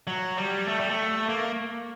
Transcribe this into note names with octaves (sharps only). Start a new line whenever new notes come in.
F#3
G3
A3
G3
A3
A#3